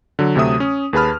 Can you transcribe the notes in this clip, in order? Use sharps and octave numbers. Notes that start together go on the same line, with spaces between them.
D3 F#3
D2 C3 F#3 A3 E5 D#6
C#4
D#2 G#4 B4 A5 B5 F6